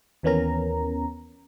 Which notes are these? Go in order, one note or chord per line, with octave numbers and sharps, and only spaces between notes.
D#2 E3 B3 C#4 A#4 A#5